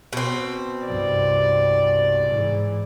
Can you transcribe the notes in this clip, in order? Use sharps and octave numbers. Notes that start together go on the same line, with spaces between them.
B2 C4
C2 G2 D5
G#2 E3